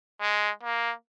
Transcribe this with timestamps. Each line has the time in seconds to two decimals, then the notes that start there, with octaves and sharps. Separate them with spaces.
0.21 G#3
0.63 A#3